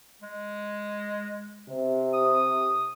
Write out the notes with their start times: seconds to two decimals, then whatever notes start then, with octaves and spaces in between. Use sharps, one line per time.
0.21 G#3
1.68 C3
2.13 D#6